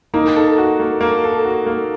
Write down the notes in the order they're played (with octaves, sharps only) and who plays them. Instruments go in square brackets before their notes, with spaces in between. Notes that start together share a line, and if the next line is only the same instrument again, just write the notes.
[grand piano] A#3 [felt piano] D#4
[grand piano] A4
F#4
A#3
A#3
A4
F#4
A#3